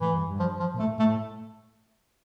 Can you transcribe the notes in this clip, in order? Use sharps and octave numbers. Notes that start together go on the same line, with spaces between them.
A2 E3
G2
G2
F3
F3
A#2
A2 A3
A2 A3